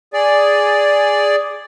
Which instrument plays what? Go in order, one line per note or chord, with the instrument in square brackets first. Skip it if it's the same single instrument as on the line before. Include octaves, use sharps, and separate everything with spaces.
[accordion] G#4 D5